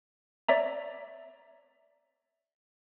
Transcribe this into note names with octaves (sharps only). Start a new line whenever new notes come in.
C#5 D5 E5 A#5